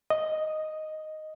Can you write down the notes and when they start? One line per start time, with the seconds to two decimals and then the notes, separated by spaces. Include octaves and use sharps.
0.10 D#5